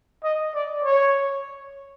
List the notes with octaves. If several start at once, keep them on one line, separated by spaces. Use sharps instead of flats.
D#5
D5
C#5